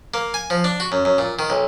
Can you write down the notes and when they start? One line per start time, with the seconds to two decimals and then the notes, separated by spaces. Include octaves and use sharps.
0.14 A#3
0.34 G#5
0.50 F3
0.64 D4
0.80 F#4
0.92 F#2
1.05 F#2
1.18 A#2
1.39 D#3
1.50 B1